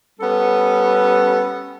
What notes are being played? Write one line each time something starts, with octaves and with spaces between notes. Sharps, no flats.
G3 B3 C#4 A4